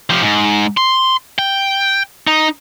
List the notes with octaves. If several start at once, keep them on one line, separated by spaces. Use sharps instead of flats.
F3 G4
G#2
C6
G5
D#4